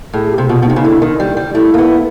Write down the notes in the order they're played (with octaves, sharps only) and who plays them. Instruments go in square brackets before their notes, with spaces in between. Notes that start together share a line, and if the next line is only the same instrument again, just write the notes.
[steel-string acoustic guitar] A2 [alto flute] G#4
[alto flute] G4
[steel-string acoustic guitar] C3
[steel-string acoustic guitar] B2 [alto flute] F4
[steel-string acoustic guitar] B2
[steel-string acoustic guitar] C3 [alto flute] D#4
[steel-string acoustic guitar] C#3
[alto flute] D#4
[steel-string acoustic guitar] D3 [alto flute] E4
[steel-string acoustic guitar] D#3
G3
G3
[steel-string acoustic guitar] A3 [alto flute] E4
[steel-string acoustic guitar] A#3
B3